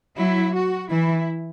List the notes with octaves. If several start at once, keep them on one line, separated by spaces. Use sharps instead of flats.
F#3 E4
F#4
E3 E4